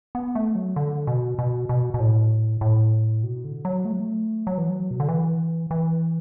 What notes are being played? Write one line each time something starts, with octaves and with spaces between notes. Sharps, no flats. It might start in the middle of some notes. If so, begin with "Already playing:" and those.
B3
A3
F#3
D3
B2
B2
B2
B2
A2
A2
B2
D3
F#3
A3
F#3
A3
F#3
E3
F#3
B2
D3
E3
E3